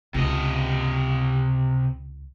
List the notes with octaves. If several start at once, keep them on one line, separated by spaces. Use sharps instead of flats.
C#2 C3 D#5